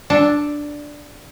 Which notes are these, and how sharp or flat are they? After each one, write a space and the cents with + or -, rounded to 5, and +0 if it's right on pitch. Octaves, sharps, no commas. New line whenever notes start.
D4 +0 A4 +0